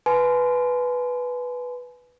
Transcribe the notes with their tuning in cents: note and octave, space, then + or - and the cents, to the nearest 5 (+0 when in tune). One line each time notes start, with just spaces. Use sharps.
B4 +0 G#5 +35 C6 -25